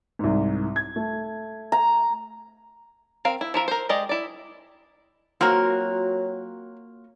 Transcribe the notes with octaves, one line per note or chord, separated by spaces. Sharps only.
C2 G#2
G#6
A3
A#5
C4 A#4 F5
E4
F3 E4 A#4
A#4 C5
G#3 G4 D5 D#5
E4 D5
F#3 A#3 C4 F4 F#4 A#4